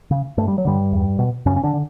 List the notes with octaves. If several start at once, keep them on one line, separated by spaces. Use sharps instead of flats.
C#3
G2 A3
G3
F#3
G2 D3 G3
E2
B2
F#2 C#3 C#4
C#4
D3 D4
D3